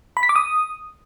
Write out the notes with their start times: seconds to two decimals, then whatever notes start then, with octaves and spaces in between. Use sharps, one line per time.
0.17 B5
0.23 B6
0.29 D6
0.36 D#6